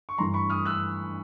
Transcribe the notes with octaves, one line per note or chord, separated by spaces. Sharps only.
C#6
G2 E3 A3 A#5 C6
B5 C#6
D#6 F6
E6 F#6